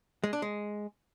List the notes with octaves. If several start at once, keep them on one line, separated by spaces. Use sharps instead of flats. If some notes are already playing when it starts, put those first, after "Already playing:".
G#3
D4
G#3